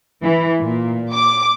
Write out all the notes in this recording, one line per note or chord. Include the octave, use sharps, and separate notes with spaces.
E3
A#2
D6